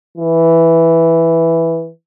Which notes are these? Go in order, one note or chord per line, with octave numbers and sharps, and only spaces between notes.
E3